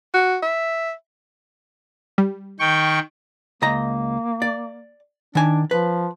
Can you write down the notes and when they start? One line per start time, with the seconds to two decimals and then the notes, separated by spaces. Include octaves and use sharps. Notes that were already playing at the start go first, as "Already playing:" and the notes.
0.14 F#4
0.43 E5
2.18 G3
2.59 D#3 G5 C#6
3.62 C#2 A#3 D#5 A#5
4.42 D5
5.35 D#3 D4 G#5
5.71 F3 B4